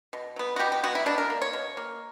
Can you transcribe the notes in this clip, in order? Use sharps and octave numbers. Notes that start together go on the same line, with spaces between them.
B2
F#3 B3
F#4
B2 G4
G4
F#3 B3 F#4
E4
B2 D4
A#4
A#3
C#5
B2
A#3